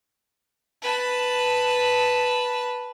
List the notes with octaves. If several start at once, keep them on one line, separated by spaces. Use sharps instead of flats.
B4 A5